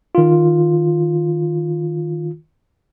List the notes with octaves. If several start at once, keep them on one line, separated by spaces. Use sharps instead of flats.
D#3 F4